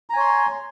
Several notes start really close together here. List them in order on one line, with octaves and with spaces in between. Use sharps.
A#5 G#5 C#5 C6